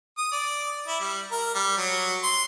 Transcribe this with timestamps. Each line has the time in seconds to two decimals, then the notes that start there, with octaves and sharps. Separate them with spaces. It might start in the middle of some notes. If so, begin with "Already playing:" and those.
0.17 D#6
0.32 D5
0.87 E4
1.01 G3
1.31 A#4
1.54 G3
1.77 F#3
2.23 C6